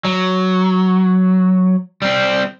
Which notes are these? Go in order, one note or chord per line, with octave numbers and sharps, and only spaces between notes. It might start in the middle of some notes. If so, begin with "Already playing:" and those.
F#3
G3 C4